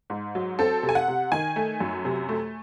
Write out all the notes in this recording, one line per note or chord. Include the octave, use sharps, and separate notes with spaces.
G#2
F#3
C4 A4
C3
G#5
F#5
C3
D#3 G#5
A3
F#2
C3
A3